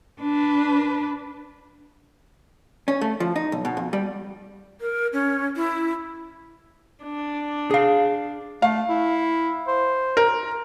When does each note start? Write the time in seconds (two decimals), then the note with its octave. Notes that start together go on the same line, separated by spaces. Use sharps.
0.22 D4 B4
2.88 C#4
3.01 A3
3.20 F3
3.36 D#4
3.52 B1
3.65 B2
3.77 F2
3.93 G3
4.81 A#4
5.13 C#4
5.56 E4
7.03 D4
7.71 G#4 F5
8.62 A3 F5
8.89 E4
9.67 C5
10.17 A#4